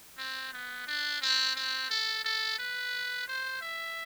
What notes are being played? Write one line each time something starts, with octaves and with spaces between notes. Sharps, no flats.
C4
B3
D4
C4
C4
A4
A4
B4
C5
E5